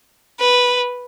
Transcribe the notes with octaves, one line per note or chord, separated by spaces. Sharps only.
B4